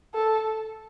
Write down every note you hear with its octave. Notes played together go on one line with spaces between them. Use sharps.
A4